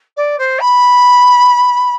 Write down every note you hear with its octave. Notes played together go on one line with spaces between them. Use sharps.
D5
C5
B5